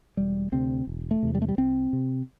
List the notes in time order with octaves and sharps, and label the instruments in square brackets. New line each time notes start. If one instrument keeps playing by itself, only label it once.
[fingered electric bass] E1 G3
D2 C3 C4
E1
A3
E2 C3
G3
A3
G3
C2 C4
C3